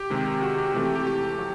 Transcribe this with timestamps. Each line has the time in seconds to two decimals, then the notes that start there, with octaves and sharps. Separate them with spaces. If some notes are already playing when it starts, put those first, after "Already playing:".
Already playing: G4
0.10 C3 D#3 G#3
0.42 F#4
0.58 G4
0.74 C3 E3 A3 C4 G4
0.85 G4
0.95 G4
1.07 G4
1.38 F#3